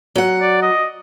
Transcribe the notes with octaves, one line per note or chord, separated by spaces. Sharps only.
F#3 F#5
D5
D#5